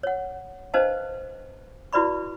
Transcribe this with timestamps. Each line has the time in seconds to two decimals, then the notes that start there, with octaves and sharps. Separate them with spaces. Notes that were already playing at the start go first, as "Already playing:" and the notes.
0.03 C#5 F#5
0.74 D4 B4 C5 D#5 F5 A5
1.93 E4 F#4 B4 D5 B5 C#6